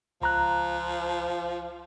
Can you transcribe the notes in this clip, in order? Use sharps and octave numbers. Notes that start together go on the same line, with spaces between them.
C#2 F3 A#5 F#6